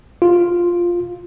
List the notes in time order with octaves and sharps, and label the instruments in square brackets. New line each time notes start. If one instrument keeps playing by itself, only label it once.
[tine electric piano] F4